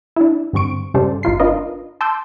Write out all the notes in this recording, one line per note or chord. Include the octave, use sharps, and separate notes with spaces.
D4 E4
G2 D3 C4 C#6 D7
G2 C#3 G3 A4 C5 D5
G1 D#4 F4 C7
D4 F4 A#4 B4 D#5
A5 C6 D6 E6 G6